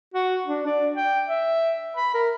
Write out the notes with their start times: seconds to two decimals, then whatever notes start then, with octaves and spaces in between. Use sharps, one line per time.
0.14 F#4
0.46 D4
0.67 D5
0.96 G5
1.28 E5
1.97 B5
2.14 A#4